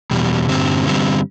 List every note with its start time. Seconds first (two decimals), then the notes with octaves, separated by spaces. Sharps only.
0.11 E2 B2 G3
0.49 G2 D3 G3 C4
0.86 G2 D3 G3 C4